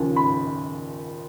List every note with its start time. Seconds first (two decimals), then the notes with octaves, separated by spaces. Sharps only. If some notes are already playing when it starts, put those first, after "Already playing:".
Already playing: D#2 C#3 F3
0.16 B5